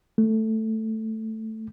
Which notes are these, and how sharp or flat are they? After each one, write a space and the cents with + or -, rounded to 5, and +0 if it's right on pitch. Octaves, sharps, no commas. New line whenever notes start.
A3 +5